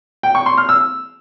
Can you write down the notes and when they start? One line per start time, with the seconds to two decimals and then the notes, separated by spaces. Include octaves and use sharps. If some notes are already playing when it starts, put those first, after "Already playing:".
0.23 G5
0.35 C#6
0.46 C6
0.57 F6
0.69 E6